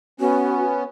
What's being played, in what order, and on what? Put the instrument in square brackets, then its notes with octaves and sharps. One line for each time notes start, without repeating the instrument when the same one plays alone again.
[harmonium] B3 C#4 [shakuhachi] F#4